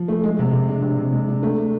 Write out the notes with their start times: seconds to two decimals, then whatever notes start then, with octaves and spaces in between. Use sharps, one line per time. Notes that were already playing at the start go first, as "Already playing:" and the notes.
Already playing: F3
0.08 A3
0.24 G#3
0.39 C3
0.53 C3
0.68 D4
0.83 C3
0.98 C3
1.13 G#3
1.28 D4
1.43 A3